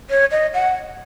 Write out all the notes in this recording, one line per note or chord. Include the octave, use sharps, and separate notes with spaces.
C#5
D#5
F#5